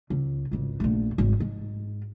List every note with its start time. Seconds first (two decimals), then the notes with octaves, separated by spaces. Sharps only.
0.10 C#2
0.51 G#1 C#2
0.80 A#1 A3
1.18 G#1
1.40 G#2